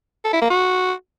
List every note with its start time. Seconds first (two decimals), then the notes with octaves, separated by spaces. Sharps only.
0.24 A4
0.33 E4
0.42 A#3
0.50 F#4